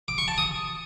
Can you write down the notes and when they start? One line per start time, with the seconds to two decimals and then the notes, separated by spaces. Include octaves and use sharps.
0.08 D6
0.18 C#6
0.28 A5
0.38 D#6